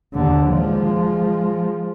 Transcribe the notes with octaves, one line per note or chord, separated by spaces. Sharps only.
D#2 D3
F3 G#3